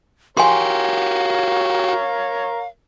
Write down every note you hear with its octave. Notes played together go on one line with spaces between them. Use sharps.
F#4 G4 A#4 C#5 F5 G#5 C6